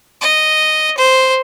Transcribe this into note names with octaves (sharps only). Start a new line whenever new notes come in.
D#5
C5